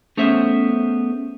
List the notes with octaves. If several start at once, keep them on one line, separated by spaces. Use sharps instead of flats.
A3 B3 C#4 G#4 C5 E5